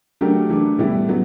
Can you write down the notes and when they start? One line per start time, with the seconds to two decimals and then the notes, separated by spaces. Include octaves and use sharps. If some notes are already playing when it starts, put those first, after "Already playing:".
0.21 F#3 A3 D4 G4 A#4
0.49 E3 A3 D4
0.79 A2 E3 G3 B3 E4
1.09 F#3 B3